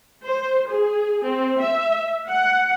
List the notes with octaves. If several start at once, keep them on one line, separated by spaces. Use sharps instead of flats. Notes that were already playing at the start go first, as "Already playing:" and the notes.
C5
G#4
C4
E5
F#5